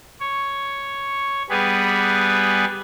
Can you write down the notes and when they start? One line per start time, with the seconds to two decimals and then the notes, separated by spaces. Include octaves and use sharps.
0.20 C#5
1.50 G3 B3 G#4 B4